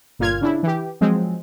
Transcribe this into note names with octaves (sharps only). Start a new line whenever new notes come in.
G1 A#2 F4 F6 G#6
C#3 D4 E4
E3 G4
F3 F#3 G#3 C4